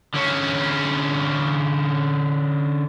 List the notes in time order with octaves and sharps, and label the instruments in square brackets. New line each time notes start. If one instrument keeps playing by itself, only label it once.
[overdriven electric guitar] D3 C#4